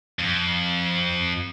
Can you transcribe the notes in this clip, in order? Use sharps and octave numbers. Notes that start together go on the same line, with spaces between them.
F2